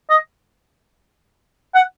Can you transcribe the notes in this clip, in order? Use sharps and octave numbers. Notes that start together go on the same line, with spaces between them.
D#5
F#5